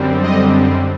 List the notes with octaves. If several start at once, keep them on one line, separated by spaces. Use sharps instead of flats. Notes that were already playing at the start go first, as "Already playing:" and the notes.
Already playing: F#2 D3 G3 C4
D#5